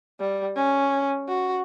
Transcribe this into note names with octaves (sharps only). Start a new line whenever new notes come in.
G3
C#4
F#4